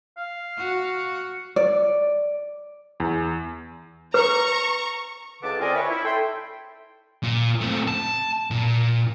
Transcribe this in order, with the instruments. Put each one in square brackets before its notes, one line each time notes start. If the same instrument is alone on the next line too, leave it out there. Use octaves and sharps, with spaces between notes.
[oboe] F5
[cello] F#4
[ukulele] D5
[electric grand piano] E2
[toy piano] B4 [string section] A#5 C#6
[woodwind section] C#2 D3 B4 A5 D6
C4 F4 A#4 D5 D#5 G#5
B4 C#5 E5
E4
A4 G5 C6
[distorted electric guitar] A#2
A3 C4
A5
A#2